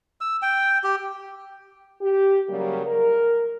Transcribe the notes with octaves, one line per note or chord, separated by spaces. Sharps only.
E6
G5
G4
G4
C#3 F#3 G3 A#3
A#4